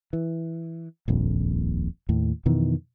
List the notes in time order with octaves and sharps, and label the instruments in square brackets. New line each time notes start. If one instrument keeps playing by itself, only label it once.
[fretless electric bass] E3
D#1 A#1 F2
D#2 A2
F2 B2 D#3 E3